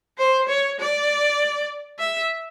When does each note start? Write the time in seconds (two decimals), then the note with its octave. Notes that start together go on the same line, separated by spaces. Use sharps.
0.18 C5
0.48 C#5
0.79 D5
1.99 E5